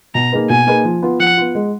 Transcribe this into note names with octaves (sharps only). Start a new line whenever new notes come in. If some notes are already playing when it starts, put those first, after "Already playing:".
B2 A#5
A#3 D#4 G#4 B4
B2 G#5
A#3 D#4 G#4 B4
F3
B3 F4
F3 F#5
B3 F4
G#3